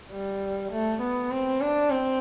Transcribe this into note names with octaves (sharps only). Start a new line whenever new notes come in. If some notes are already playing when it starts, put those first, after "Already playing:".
G3
A3
B3
C4
D4
C4